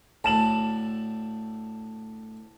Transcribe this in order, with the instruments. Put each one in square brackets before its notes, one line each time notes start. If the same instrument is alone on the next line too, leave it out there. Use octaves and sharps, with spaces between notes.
[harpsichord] D2 A2 [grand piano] A5 E7 F#7